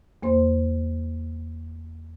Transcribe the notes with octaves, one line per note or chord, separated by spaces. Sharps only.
E2 A#3 C5 C6